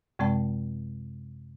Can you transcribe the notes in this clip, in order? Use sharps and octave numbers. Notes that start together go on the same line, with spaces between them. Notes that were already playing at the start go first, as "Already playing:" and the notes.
F#2 C3 G#3 C4 D5 A5